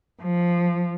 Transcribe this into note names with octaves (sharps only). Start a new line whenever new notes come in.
F3